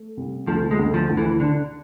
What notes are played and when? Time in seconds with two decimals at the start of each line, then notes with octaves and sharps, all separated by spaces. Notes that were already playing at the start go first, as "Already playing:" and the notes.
Already playing: A3
0.17 C2
0.47 D2 F3
0.71 G#3
0.79 D2
0.94 F3
1.09 D2
1.17 E3
1.40 D3 D4